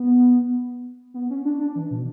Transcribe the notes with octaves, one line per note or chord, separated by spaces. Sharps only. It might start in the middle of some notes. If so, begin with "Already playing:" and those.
Already playing: B3
B3
C#4
D4
D4
E3
B2